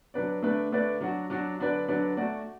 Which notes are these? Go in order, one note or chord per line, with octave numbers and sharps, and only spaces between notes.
F#3 D4 B4 D5
D3 A3 D4 B4 D5
D3 A3 D4 B4 D5
F#3 D4 F#4
F#3 D4 F#4
D3 F#3 D4 B4 D5
D3 F#3 D4 B4 D5
A3 F#4 D5